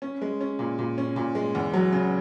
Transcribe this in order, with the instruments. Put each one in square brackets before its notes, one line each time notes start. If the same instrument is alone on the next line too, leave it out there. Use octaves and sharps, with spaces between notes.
[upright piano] C#4
G#3
C#4
A#2
A#2
C#4
A#2
G#3
E2
F#3
C#3